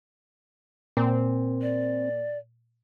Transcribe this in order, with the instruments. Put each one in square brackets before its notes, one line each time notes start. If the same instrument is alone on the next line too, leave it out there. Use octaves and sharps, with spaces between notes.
[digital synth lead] A#2 [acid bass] C4
[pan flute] D5